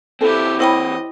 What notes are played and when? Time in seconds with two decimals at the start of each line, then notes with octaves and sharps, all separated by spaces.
0.21 E3 C4 E4 G4 A4 C5
0.60 E4 C5 C#5 D#5 G5 B5